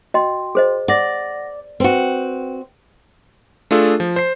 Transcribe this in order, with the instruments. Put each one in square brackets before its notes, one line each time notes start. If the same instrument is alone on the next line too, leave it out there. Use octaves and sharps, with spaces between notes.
[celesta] F#4 G5 C6 [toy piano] D#5
[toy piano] G#4 C5 D#5
[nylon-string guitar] D5 [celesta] F#5 A#6
[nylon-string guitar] C4 F#4 [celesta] B4 G5
[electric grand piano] A3 D4 F4 G#4 A4
F3
C5 C7